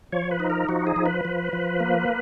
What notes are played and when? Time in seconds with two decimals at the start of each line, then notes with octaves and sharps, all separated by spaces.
0.12 F3 C#5
0.31 B4
0.40 D#4
0.50 A#4
0.69 F3 F#4
0.87 G#4
0.96 F3
1.06 B4
1.25 F3
1.53 F3
1.80 A#3